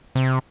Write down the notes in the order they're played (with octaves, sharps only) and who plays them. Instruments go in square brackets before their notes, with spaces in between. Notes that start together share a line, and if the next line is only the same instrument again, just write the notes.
[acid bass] C3